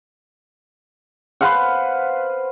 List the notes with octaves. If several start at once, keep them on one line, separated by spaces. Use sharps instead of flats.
B4 C5 F5 F#5